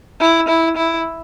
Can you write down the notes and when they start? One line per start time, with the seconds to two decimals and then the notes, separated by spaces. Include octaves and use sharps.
0.20 E4
0.48 E4
0.77 E4